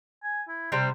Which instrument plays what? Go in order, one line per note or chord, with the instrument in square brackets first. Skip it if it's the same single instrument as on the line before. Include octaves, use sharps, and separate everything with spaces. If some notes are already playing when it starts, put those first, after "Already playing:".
[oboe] G#5
E4
[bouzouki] C3 G3 C4 [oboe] G5